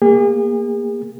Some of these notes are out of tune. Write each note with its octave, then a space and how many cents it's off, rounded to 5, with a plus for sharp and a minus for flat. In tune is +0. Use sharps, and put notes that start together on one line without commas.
A#3 +0 G#4 -40